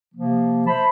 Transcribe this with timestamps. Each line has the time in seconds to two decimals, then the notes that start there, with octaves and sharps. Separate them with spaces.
0.15 C3 F3 A#3
0.67 C5 E5 A5 B5